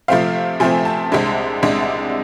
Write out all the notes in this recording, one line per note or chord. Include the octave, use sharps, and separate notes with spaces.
C3 F3 A3 C4 F5
C3 F3 A3 C4 G#5
A5
C2 C3 G#3 D4
C2 C3 G#3 D4